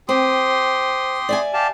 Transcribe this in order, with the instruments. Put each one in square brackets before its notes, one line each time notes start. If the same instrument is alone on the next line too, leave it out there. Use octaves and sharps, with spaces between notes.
[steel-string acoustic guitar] C4 [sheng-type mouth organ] G4 C6 D#6
[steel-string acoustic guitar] D5 E5 G#5
[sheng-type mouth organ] G4 F5 A5